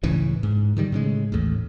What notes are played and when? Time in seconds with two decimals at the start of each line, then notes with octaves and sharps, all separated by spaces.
0.03 C#2 A2 C#3 E3
0.43 G#2
0.77 D3 D#3 G3
0.92 A2 C#3 G#3
1.32 A1 D#2 A2